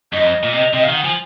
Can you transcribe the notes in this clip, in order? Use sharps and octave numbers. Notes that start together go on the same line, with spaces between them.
F#2 D#5
F2
A#2
C3
C3 D#5
F5
D#3
F#5
F3 G#5